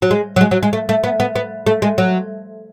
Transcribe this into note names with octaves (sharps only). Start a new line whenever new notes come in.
F#3
G#3
F#3
G#3
F#3
G#3
A3
A3
B3
B3
B3
A3
G#3
F#3